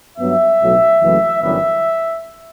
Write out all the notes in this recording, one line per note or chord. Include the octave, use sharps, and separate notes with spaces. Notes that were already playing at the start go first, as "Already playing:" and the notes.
G2 F#3 B3 E5
B1 A2 F#3 B3
F#1 F#2 E3 A3
G1 F#2 E3 G3 B3 E5